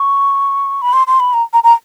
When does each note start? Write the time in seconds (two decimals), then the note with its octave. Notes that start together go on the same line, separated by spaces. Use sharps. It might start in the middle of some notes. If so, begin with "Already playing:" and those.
Already playing: C#6
0.82 B5
0.93 C6
1.07 C6
1.20 B5
1.33 A#5
1.53 A#5
1.64 A#5